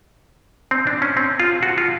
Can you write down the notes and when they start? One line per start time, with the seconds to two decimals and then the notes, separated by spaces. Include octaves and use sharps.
0.71 C4
0.87 D4
1.02 C#4
1.17 C4
1.40 F4
1.63 F#4
1.78 F4